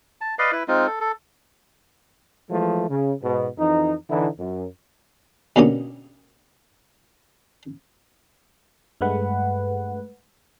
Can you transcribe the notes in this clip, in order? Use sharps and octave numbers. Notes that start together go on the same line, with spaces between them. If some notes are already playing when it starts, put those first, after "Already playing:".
A5
B4 D5 D#5 F5
E4 B4
G#3 C4 D#4 F4
A4
A4
E3 F3 G#3 A3
C#3
G#2 B2
F2 E3 D#4
D3 E3 D#4 E4
F#2
B2 D3 A#3 C#4 G4 D#6
G2 G#3 A3 B4 F#5